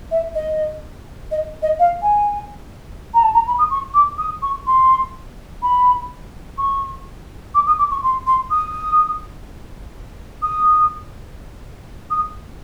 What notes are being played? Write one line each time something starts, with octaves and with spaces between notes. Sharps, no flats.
E5
D#5
D#5
D#5
F5
G#5
A#5
A5
A#5
B5
D#6
C#6
D6
D#6
C#6
C6
B5
C#6
D6
D#6
D6
C#6
C6
C6
D#6
D#6
D#6